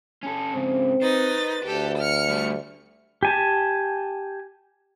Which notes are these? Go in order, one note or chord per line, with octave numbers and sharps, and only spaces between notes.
C#4 A4
G#2 C#3 C4
D#4 B4 C5 A6
D2 G4 A4
F6 C#7
G3 A3
G4 G#5 A5